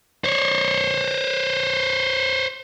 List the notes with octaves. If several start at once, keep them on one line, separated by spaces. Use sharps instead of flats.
C5 C#5